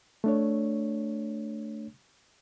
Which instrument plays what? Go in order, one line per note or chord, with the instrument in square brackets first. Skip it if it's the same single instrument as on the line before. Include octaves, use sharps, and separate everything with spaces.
[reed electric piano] A3 D4 C#5